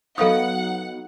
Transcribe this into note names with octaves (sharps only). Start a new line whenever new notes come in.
F#3 B3 D#4 A4 F5 F#5 D#6